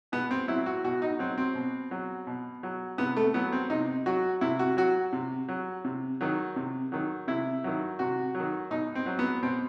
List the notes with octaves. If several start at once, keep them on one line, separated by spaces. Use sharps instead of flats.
B2 B3
C4
F#3 E4
F#4
B2 F#4
D#4
F#3 C4
C4
B2
F#3
B2
F#3
C3 B3
A3
F#3 B3
C4
C3 D#4
F#3 F#4
C3 E4
F#4
F#3 F#4
C3
F#3
C3
D#3 F#3
C3
D#3 F#3
C3 E4
D#3 F#3
C3 F#4
F#3
D#3
B2 D#4
C4
F#3
B3
B2 C4